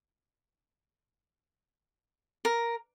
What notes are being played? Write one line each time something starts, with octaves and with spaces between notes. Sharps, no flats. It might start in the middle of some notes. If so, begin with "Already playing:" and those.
A#4